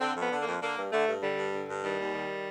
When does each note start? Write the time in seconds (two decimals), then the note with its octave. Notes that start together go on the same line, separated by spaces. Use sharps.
0.01 D3 C4
0.16 F2
0.22 B3
0.31 D3
0.42 A#3
0.47 F2
0.62 D3 A#3
0.77 G2
0.92 D3 A3
1.08 G2
1.22 D3 G3
1.38 G2
1.53 D3
1.69 G2
1.84 D#3 G3
1.99 D#2
2.14 D#3